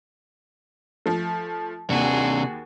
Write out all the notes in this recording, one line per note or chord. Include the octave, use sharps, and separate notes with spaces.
F3 A3
D#2 C3 D4 F#4 G#4